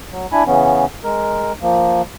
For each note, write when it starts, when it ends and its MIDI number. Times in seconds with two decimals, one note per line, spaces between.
0.12 0.26 54
0.32 0.43 62
0.32 0.43 64
0.32 0.43 80
0.32 0.43 83
0.47 0.85 49
0.47 0.85 52
0.47 0.85 59
0.47 0.85 61
1.04 1.52 56
1.04 1.52 70
1.62 2.02 53
1.62 2.02 58